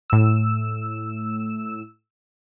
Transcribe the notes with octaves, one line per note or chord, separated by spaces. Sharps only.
A2 E6